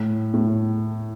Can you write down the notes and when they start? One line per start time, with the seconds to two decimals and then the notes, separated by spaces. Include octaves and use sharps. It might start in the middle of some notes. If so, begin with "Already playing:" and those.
Already playing: A2
0.34 A2